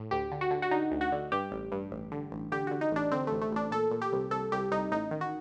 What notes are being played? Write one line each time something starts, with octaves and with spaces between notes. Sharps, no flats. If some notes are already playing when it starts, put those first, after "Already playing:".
Already playing: A2
D2 G4
D3
F#4
D3
F#4
D3 D#4
D2
F#4
D3
G2 G4
A1
G2
A1
D3
A1
D3 G4
D3 F#4
D#4
A1
D4
D3 C4
A1 A3
A3
A1 D4
A#2 A4
A#2
G4
C2
C2 A4
C2 G4
C2 D#4
A1 D#4
D#3
F#4